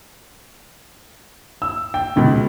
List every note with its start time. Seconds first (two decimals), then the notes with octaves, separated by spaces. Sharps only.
1.62 E6
1.94 G5
2.16 C#2 B2